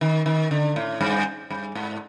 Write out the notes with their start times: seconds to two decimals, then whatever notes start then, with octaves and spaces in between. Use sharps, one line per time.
0.01 D#3
0.26 D#3
0.51 D3
0.76 A2
1.01 G2
1.50 G2
1.75 G#2